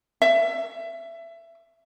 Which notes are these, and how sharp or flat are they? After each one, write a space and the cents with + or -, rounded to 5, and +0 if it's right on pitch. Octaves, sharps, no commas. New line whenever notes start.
E5 +20